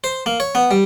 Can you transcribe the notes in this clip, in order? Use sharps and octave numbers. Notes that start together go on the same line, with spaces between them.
C5
A#3
C#5
B3
G3